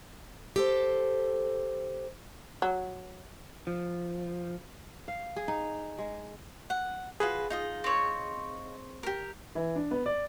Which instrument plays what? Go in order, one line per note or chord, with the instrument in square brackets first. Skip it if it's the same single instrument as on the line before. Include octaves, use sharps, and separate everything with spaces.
[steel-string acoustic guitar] G4 A4 C5
[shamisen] F#3
[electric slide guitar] F3
[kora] F5
G#4
D#4
G#3
[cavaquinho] F#5
[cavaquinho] F4 F#4 B4 [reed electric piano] G#4
[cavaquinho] D#4 F4 D#5
[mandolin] C4 C#5
[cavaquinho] G4 A#4
[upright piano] E3
D4
B3
D5